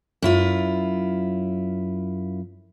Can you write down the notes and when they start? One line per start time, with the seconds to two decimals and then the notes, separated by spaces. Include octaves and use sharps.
0.22 F#2 E4 F4